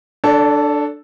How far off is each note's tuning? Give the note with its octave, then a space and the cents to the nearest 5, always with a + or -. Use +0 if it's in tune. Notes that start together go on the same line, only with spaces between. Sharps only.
D4 +10 A4 +0 D5 -40